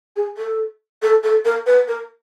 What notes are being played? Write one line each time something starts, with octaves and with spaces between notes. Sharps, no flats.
G#4
A4
A4
A4
A#4
B4
A#4